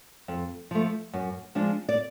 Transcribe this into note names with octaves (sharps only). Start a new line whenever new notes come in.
F2
F3 A3
F#2
F3 G#3 D4
D5